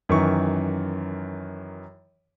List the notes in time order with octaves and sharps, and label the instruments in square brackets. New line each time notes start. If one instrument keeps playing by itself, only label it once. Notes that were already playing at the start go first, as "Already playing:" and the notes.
[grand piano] F#2 D#3 E3 C#6